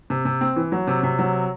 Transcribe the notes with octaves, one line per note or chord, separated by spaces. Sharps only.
C3
C3
C4
E3
F#3
C3
C3
F#3